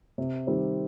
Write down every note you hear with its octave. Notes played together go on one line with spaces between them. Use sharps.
C3
D#3 G3 C4